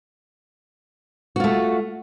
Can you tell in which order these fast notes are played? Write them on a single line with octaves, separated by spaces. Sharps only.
F#4 F4 A3